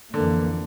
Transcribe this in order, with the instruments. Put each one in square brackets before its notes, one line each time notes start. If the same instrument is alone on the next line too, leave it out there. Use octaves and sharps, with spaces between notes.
[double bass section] F2 E3 A#3 [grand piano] D3